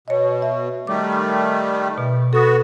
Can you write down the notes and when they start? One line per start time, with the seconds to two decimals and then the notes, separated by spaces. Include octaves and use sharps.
0.08 B2 C#5 D#5
0.42 E5
0.87 D#3 G3 A3 D6
1.98 B2
2.33 B3 F#4 A4 D#6